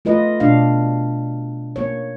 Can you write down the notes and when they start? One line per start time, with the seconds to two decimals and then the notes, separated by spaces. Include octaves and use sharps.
0.05 A3 F4 B4 D#5
0.40 B2 D4 F5
1.76 A#3 C#5